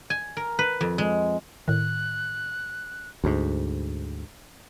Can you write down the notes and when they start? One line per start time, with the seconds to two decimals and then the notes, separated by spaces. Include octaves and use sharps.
0.10 G#5
0.37 A#4
0.59 B4
0.81 F2
0.98 G#3
1.68 A2 D#3 F#6
3.24 D2 G#2